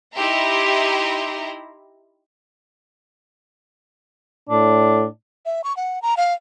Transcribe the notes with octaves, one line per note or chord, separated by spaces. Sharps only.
D#4 E4 G4 E5 A#5 C6
A2 D4
E5
C#6
F#5
A#5
F5